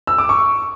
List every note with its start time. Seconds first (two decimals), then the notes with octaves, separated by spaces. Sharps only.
0.07 E6
0.18 D6
0.29 C#6